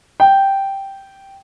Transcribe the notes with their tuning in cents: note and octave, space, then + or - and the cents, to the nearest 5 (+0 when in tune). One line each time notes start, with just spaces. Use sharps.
G5 -5